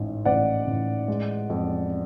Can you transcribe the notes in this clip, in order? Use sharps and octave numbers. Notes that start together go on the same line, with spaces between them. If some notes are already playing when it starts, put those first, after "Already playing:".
Already playing: A1 G#2
A1 D5 F#5
A1
G#3
F2